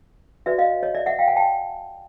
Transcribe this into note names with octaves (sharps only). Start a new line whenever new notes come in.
F#4 B4 D5 E5
D#5 F5
C#5 D#5
D5 E5
E5 F#5
F5 G5
F#5 G#5
G5 A5